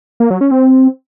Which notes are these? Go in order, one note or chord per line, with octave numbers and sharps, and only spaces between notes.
A#3
F#3
C#4
C4